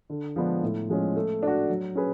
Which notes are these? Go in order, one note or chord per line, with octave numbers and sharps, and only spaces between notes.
D3
F3 G#3 B3 D4
A2
F3 G#3 C#4
A3
D4 F#4
F#3
C#4 G#4 B4